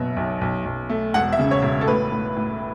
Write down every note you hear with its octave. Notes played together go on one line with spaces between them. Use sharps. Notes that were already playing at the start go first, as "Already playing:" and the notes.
Already playing: F#1 B2 F#3 E5
B1
B1
B1
A3
E1 F#5
E5
C#3
C#5
E1
A4
A2 B4
A2
A2